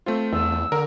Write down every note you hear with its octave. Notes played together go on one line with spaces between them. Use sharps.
A3 C4 F4 C5
E2 E6
D3 A#4